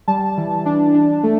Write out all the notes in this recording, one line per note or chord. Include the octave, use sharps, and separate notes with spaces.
G3 A5
E3
D4
D4
A3